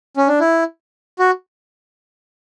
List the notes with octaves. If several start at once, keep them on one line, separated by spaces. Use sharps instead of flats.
C#4
D4
E4
F#4